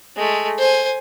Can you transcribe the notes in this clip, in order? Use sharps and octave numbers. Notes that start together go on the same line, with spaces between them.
G#3 A3
C5 G#5